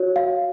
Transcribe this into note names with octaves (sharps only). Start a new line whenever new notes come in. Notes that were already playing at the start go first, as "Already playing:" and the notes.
Already playing: F#4 C#5
F5